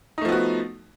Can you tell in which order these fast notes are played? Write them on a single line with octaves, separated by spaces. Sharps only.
D#4 A3 F3 B3 F#4